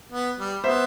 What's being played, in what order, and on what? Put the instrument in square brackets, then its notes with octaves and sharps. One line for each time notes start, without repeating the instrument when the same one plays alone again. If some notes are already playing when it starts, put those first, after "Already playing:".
[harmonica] B3
G3
[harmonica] B3 [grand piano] C5 E5